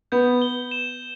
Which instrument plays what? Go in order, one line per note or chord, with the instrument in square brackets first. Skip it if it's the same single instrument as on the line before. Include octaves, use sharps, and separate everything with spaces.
[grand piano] B3 [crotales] G6
[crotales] G7
E7